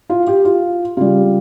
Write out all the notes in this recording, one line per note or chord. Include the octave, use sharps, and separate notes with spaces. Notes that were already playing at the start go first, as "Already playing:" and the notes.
F4
G4
F4
C#3 G3 F4